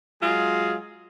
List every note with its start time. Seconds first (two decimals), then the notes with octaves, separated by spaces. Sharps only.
0.22 F#3 G#3 F4 G#4